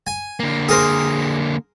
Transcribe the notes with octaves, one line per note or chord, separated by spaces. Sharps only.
G#5
D3 A#3
G#4 A#4 C5